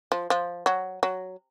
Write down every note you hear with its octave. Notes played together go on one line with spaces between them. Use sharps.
F3
F3
F#3
F#3